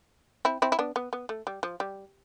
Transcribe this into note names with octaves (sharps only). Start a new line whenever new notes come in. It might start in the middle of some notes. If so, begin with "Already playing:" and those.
C4 E4
C4 E4
E4
B3 D4
B3
B3
A3
G3
F3
G3